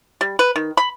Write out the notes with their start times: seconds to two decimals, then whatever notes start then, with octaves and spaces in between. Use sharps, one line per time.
0.21 G3
0.39 B4
0.56 D#3
0.77 B5